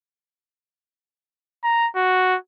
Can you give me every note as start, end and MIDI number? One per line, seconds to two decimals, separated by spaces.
1.64 1.88 82
1.96 2.36 66